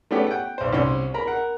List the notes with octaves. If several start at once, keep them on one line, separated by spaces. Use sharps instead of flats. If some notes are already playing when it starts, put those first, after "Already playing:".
A3 B3 C#4 G4
F#5 G5
B1 C5
C2 C#4 C6
A#4 A#5 B5
A#4 F#5